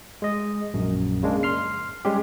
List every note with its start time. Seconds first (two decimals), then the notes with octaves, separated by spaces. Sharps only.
0.22 G#3 D#5
0.74 A#1 F#2
1.23 C#3 G#3 A#3 D4
1.43 C6 F6 C7
2.05 G3 G#3 C#4 G4